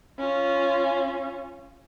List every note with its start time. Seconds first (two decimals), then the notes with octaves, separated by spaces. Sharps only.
0.19 C#4 F4